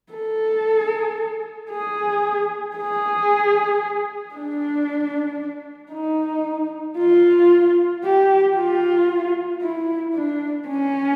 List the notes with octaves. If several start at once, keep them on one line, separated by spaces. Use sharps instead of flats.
A4
G#4
G#4
D4
D#4
F4
G4
F4
E4
D4
C#4